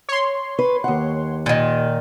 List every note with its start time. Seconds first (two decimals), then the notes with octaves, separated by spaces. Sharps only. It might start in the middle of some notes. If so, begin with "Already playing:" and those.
0.09 C#5 C6
0.59 B4
0.84 D#2 F#5
1.46 A#2 D#3